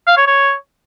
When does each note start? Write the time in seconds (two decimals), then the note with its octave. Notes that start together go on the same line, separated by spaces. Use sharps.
0.07 F5
0.17 C#5
0.27 C#5